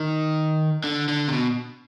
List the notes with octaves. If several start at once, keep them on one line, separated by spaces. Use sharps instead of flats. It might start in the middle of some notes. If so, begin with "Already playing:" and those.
Already playing: D#3
D3
D3
C3
B2